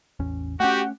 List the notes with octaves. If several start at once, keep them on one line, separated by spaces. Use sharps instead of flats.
A1 E2 C#4
A3 C#4 F#4 G4 F#5